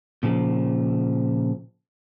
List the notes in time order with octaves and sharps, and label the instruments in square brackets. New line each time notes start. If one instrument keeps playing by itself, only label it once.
[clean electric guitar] A#2 C#3 F3